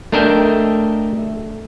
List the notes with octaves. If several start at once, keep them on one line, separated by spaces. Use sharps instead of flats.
A3 D4 A#4 D#5 E5 G5